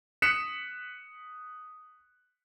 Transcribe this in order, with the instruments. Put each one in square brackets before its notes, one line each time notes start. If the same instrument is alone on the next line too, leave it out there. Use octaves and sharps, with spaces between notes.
[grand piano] D#6 F#6 B6 C#7 E7